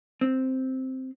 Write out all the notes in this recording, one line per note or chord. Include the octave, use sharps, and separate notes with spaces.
C4